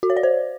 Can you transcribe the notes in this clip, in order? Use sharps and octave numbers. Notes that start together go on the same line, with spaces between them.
F#4
C#5
D5
C5